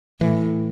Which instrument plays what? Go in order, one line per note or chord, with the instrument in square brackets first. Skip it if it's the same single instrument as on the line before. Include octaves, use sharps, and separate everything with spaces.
[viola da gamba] A2 [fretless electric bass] E3